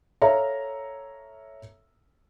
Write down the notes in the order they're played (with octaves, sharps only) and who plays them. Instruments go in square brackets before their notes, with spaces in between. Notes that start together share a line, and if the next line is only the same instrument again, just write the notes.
[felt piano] A4 C#5 E5 F5 A#5